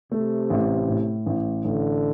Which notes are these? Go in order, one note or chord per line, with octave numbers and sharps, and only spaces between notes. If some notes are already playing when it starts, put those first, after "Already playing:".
C3 A3
A1
A2
A1
A1 D3